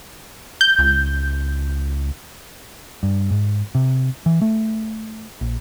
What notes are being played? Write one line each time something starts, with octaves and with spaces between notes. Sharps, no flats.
G6
C#2
G2
G#2
C3
E3
A3
A#1